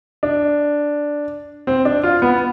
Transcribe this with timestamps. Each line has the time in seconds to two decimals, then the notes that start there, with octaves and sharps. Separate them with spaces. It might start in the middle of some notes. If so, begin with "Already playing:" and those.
0.23 D4
1.67 C4
1.85 D4
2.03 F4
2.22 B3